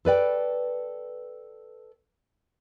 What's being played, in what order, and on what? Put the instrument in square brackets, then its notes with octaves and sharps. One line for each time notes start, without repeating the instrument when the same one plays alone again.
[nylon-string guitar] A4 B4 D5 G5